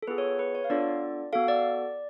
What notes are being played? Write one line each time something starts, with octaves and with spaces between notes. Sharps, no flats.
A4
B3 F4 G#4 B4
C#5
B4
C#5
F5
B3 D4 F4 A4 D5
B3 F#4 A4 F5
D5